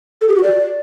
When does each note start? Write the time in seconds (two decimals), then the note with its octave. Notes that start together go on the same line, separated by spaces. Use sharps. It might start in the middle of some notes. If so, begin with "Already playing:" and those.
0.21 A4
0.29 G4
0.36 F#4
0.43 D5